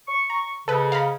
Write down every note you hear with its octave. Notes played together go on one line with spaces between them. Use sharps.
C#6
A#5
G#2 C#3 A4 B4
F5 A#5 B5